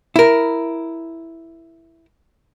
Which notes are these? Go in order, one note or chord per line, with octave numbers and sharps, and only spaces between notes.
E4 A#4